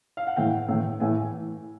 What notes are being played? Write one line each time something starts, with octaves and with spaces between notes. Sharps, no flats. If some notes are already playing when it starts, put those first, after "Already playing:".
F5
F#5
A2 E3 G5
A2 E3
A2 E3 G#5